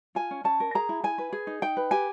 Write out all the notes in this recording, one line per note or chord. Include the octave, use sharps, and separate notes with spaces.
F4 G#5
C#4
C#4 A5
A#4
G#4 A#5
E4
E4 G#5
B4
G#4
D#4
D#4 G5
B4
G4 G#5